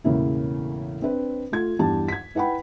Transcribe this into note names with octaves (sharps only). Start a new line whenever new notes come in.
E1 E2 A2 C#3 A#3 E4
C4 D4 B4
A3 F4 G#6
E2 G2 G4 A5
G#6 B6
E4 B4 F#5 G5 B5